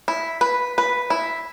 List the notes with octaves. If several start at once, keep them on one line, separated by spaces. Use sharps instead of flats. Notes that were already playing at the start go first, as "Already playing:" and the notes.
E4
B4
B4
E4